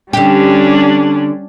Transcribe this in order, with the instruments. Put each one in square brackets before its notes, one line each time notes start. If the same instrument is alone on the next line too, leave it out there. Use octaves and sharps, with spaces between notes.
[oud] D3 G4 [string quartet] G3 C#4 D4